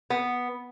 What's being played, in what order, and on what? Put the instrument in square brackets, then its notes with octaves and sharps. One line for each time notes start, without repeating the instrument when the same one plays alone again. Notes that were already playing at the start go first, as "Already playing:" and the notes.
[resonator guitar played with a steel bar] B3